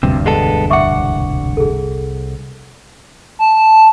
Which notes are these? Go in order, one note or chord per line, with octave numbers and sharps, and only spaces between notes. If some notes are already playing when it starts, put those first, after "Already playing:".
E1 D2 G2 C3
G#3 B3 A4
C2 E5 F#5 C#6 D6
G#4 A4
A5